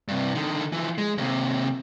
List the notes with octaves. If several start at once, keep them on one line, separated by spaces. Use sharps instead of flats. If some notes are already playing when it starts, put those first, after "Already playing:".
G2 C3
D3 D#3
E3 F3
G#3
D#2 C3